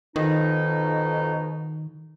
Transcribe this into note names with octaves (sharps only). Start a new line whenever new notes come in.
F2 B2 D#3 D#4